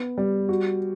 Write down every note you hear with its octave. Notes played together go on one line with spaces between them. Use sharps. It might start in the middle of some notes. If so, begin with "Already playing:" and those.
Already playing: B3
G3
F#4